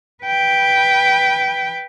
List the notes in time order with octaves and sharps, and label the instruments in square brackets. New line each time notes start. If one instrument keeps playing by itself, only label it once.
[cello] B4 G5